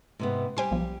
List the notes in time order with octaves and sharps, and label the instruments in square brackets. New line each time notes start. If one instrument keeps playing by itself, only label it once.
[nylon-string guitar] G#2 C3 B3
[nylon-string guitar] G3 G4 [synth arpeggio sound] C5 G#5 C6
[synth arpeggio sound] B1 F3